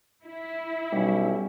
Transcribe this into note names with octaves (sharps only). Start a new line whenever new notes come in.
E4
B1 G3 C#4